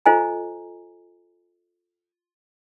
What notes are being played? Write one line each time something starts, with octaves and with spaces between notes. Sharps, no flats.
F4 A4 C5 D#5 G#5 A#5